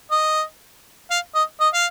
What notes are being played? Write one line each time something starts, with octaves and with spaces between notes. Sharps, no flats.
D#5
F5
D#5
D#5
F5